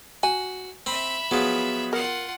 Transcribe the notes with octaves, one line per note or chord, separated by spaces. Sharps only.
F#4 G#5
C4 E5 B5
F3 F#3 B3 G#4
F4 A#4 F#5